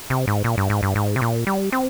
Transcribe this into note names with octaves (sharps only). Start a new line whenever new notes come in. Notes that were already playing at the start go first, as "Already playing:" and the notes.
C3
G#2
A#2
G2
G#2
G2
G#2
C3
A#2
G3
C4